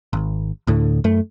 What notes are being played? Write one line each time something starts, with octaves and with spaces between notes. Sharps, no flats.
G#1
D2 A2 D3
F#2 A3